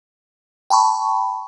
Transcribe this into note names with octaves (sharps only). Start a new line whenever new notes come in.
G5 A5 B5 C#6